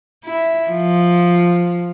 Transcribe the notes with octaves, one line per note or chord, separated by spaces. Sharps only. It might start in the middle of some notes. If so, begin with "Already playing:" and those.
E4
F3